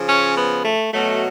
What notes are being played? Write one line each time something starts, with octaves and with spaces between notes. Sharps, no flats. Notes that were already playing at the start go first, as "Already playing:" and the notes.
Already playing: C#3 F3
C#4
B3
A3
B2 F#3 A3